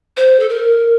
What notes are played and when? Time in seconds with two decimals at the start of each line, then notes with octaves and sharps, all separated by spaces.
0.17 C5
0.40 A4
0.49 A#4